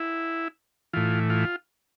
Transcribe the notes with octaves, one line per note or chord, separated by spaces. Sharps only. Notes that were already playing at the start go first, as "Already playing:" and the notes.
Already playing: E4
A2 E3 F4
F4